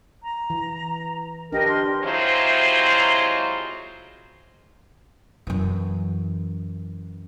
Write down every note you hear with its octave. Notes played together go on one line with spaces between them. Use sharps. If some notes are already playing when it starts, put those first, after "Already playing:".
A#5
E3
D4 G4 A#4 B4 D#5 G5
C6 F6
C3 F#3 G#3 E4 F4 C5
F#2 E3